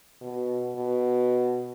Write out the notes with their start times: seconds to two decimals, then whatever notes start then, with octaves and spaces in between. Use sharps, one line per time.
0.21 B2
0.76 B2